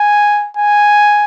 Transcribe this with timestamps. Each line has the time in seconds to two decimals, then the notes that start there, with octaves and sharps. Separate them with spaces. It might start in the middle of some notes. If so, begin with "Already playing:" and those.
Already playing: G#5
0.57 G#5